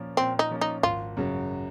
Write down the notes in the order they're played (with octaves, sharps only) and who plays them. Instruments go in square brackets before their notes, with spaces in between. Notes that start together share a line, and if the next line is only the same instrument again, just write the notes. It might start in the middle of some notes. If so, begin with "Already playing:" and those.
Already playing: [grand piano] A#2 F3 A#3 C#4
[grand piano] A#2 [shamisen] C4
[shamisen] D#4
[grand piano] F3 A#3 C#4
[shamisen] D#4
[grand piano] G#1 [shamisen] F4
[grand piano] F#2 C#3 F#3